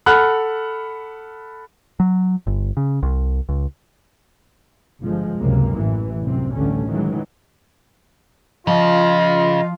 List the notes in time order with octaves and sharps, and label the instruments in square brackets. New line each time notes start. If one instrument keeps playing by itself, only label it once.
[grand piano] A4 F#5 B5 F6 F#6
[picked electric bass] F#3
G1
C#3
C2
C#2
[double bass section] G1 F3 G#3
C#2 F#2 C3 A#3
A1 E3
C2 F#2 C3 C4
A1 D2 D3 G3 A3 C#4
D#3 E3 F#3 G#3
[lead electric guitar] C#3 [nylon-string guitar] F3 [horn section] F4 [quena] D#5